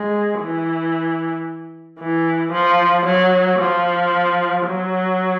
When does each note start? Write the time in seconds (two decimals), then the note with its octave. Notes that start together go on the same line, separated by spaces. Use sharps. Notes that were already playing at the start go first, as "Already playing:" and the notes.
Already playing: G#3
0.41 E3
1.99 E3
2.53 F3
3.06 F#3
3.59 F3
4.66 F#3